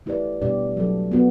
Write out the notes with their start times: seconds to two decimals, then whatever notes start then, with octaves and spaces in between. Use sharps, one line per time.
0.06 A3 E4 G4 B4 D5
0.41 B2 G3 D4 G4 D5
0.77 F#3 A3 D4 A4
1.11 B3 F#4 B4